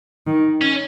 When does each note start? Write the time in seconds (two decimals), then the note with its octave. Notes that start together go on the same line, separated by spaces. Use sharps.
0.27 D#3
0.61 C#4